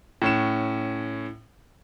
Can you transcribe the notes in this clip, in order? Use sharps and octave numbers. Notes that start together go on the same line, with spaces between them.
A2 C#4 E7